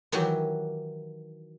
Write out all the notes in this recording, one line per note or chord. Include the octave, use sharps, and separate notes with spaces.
D#3 E3 F#3 F#4 G4